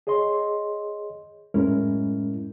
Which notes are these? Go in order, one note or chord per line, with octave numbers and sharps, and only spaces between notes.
G#4 C#5 D#5 C6
F#2 A2 G#3 C#4 E4 A#4